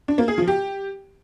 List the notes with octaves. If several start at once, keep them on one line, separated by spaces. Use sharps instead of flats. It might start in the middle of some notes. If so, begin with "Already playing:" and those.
D4
A#3
G#4
F3
G4